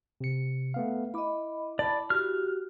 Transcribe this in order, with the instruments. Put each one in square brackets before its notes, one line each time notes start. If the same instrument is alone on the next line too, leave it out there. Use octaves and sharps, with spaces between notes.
[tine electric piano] C3 C#7
A3 B3 F5
[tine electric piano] E4 D6 [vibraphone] D#5 B5
[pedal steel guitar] D5 [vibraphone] A5 B5
[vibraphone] F#4 G4 [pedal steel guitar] F6